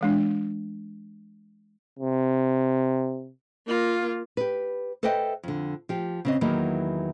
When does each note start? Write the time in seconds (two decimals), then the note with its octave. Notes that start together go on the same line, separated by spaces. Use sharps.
0.01 E3 G#3 D4
1.99 C3
3.67 A#3 F4
4.37 G4 B4
5.03 A4 B4 C5 D#5 E5 G5
5.43 F2 D3
5.89 F3 G4
6.25 C#3 C4 D#5
6.41 E2 D#3 E3 F#3 A#3